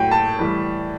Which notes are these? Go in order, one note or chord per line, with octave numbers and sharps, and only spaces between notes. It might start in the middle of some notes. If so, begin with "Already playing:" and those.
Already playing: A2 F#3 G5
A5
A2 E3 G3